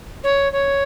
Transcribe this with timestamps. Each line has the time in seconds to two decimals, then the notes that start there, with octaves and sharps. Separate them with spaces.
0.23 C#5
0.52 C#5